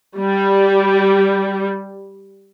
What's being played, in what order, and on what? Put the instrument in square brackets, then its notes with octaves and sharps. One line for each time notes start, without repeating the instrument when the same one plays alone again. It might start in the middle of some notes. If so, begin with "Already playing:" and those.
[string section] G3